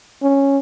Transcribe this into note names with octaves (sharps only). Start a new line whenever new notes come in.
C#4